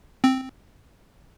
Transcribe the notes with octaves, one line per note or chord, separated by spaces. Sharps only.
C4